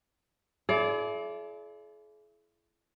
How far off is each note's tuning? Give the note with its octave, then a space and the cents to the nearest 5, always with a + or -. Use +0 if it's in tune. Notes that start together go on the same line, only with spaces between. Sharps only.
E4 +35 G#4 +45 D5 -15